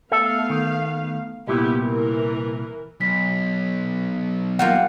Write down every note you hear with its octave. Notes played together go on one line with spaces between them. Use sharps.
A3 B3 A4 E5 F5
D#3
C2 A#2 B3 E4 G4
E3 A#4
B1 B6
G3 A#3 F4 F#5